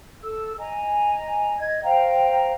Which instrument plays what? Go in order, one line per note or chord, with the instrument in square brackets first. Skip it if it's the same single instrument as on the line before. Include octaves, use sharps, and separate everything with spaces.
[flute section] A4 E6
D#5 G#5 A#5
D#5 G#6
C5 F5 G5 A#5